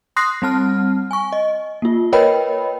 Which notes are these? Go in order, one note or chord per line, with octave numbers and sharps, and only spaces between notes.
C6 D#6 F#6 A#6 C7
G3 C4 A5 F6
G#5 C#6
D#5
A#3 F4
A#4 B4 C#5 D#5 G5 B5